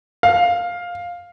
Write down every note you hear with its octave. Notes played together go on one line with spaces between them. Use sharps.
F5